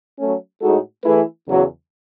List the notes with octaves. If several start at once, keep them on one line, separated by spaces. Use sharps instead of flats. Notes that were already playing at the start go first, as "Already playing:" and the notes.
F#3 A3 C#4
A2 G#3 D#4 F#4 A4
E3 A3 E4 G#4 B4
E2 C#3 F#3